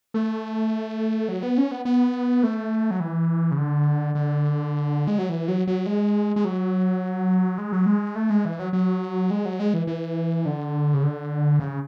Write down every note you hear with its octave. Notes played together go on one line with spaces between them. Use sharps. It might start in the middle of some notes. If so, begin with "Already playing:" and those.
A3
F#3
B3
C#4
B3
B3
A3
F#3
E3
C#3
D3
D3
G#3
F#3
E3
F#3
F#3
G#3
G#3
F#3
G#3
F#3
G#3
A3
G#3
E3
F#3
F#3
G#3
F#3
G#3
E3
E3
D3
C#3
D3
C#3